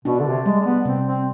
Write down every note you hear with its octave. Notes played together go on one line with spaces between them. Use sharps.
B2 D4
D3
C3
G3 G#3
G#3
B3
C3 C4
C4